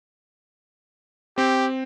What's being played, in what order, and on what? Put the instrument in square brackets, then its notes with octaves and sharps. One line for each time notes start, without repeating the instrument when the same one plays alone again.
[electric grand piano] C4 [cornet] G4